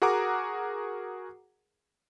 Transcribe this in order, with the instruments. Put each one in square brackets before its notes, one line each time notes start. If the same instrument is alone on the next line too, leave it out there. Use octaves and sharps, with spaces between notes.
[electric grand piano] F#4 G#4 A#4 F#5 A#5 D6